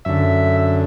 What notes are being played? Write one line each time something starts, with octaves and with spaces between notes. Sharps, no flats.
F#2 D3 E5